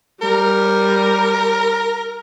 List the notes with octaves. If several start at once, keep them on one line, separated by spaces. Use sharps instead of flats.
G3 A#4